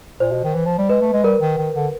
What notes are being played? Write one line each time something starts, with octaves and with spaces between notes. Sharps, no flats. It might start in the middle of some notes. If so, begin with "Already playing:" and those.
A#2 C5
B2
D#3
E3
F3
G3
G#3 B4
A3
G#3
G3 A#4
D#3
D#3
D3